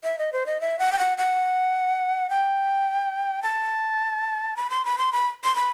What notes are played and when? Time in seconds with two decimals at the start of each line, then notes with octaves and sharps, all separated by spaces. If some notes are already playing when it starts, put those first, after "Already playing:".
0.04 E5
0.19 D#5
0.33 C5
0.46 D#5
0.61 E5
0.79 F#5
0.92 G5
0.99 F#5
1.18 F#5
2.30 G5
3.43 A5
4.56 B5
4.70 C6
4.85 B5
4.98 C6
5.13 B5
5.44 C6
5.56 B5